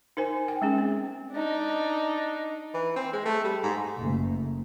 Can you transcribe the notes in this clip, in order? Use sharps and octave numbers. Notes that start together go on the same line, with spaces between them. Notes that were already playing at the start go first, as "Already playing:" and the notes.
D#4 A#4 C5 G#5
G5
G#3 C#4 G#4
C4
D4 D#4
E3
C4
G#3
A3
G3
G#2
F#1 A3